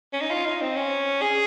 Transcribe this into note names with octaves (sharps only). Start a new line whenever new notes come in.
C#4
D#4
F4
D#4
C4
C#4
G#4